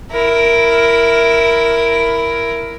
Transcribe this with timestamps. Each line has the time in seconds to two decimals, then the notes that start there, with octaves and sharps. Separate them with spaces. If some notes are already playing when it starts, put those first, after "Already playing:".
0.11 E4 A#4